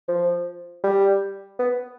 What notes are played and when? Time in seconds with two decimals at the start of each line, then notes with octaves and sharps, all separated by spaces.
0.08 F3
0.84 G3
1.59 B3